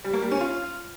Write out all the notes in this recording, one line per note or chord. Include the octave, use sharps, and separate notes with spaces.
G3
A#3
G3
C#4
F4